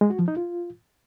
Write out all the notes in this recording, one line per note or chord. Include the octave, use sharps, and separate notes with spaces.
G#3
F#4
F3
D#4
F4